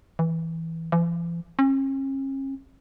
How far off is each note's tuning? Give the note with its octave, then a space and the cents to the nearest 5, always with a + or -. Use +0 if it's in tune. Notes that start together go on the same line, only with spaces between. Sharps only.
E3 -10
E3 +45
C#4 -40